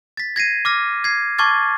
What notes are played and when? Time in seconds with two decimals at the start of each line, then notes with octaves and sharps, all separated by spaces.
0.17 A6 B6
0.36 G#6 A#6 C7 D#7
0.65 D6 F6 A#6
1.04 G#6 C7
1.38 A5 C#6 D6 F6 G#6 A6